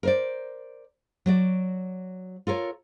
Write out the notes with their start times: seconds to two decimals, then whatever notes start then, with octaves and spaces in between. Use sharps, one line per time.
0.03 A#4 C5 D5
1.26 F#3 F#4 D5
2.47 F4 A4 A#4 C#5